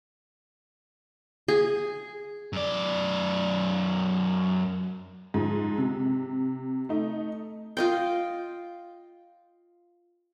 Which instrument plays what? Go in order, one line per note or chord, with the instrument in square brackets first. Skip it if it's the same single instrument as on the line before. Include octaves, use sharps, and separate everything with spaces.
[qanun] G#4
[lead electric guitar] F#2 D5
[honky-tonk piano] G#2 F3
C3
A3 D#4
[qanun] F4 D#5 G5